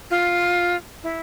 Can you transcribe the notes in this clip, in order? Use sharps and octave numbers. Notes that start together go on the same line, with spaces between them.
F4
E4